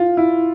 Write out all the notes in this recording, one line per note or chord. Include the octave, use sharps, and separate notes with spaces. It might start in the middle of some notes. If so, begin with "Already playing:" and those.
Already playing: F4
E4